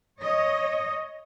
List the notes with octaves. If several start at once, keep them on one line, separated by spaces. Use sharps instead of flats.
C#5 D#5